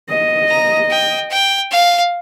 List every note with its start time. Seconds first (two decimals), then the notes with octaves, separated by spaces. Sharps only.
0.09 D#5
0.49 A#5
0.90 G5
1.30 G5
1.71 F5